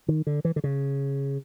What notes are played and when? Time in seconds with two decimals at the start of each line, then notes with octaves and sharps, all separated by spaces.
0.08 D#3
0.27 D3
0.45 E3
0.56 D3
0.64 C#3